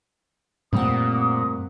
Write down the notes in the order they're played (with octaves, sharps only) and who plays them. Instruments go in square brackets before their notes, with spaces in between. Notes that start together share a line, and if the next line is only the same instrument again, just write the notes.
[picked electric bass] F#2 G3 A3 [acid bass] A#2 [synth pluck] C4 A#4 F#5 [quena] D#6